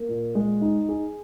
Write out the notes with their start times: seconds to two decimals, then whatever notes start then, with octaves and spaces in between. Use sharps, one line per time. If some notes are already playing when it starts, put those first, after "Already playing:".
Already playing: A#3
0.09 A#2
0.35 G#3
0.61 D#4
0.89 G#4